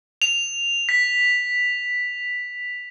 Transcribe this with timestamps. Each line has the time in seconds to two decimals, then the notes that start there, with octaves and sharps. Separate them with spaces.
0.22 F7
0.89 B6